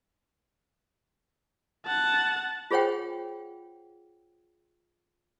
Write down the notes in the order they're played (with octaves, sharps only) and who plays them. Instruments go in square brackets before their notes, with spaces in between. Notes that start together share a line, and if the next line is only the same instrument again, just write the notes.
[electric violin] F#5 A5
[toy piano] F4 G#4 C5 C#5 F#5 G5